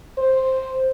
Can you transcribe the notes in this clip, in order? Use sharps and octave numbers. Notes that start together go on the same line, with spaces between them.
C5